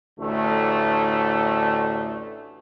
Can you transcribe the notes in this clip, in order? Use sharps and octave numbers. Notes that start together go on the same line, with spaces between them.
A1 D2 A3